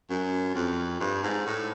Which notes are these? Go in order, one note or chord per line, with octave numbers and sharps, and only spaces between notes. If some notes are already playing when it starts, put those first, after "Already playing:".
F#2
F2
G2
G#2
A2